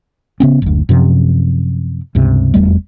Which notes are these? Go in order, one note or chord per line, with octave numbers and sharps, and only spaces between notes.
C#3 B3 C#4
F#1 D2
F#2 C3 F3
C#2 G2 C3
F1 E2 G3 A3